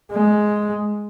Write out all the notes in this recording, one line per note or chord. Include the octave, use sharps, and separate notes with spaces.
G#3